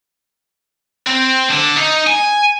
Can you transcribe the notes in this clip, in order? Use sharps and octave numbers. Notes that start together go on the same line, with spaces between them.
C4
D3
D#4
G#5